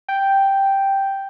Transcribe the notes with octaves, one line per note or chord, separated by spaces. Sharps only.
G5